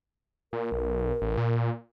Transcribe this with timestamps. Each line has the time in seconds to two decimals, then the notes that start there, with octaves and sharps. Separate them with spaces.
0.53 A#2 A#4
0.72 B1
1.22 A1
1.38 A#2